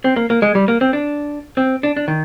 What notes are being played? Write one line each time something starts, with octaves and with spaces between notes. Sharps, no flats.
C4
A#3
A#3
G#3
G3
A#3
C4
D4
C4
D4
D4
D#3